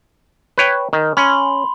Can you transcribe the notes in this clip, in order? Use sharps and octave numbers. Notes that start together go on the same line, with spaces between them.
B4 C#5 G5
D#3
C#4 B5 C6